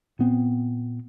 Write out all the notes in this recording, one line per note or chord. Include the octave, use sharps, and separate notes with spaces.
A#2 B3 C4